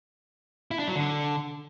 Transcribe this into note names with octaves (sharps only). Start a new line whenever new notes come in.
E4
D4
F#3
D3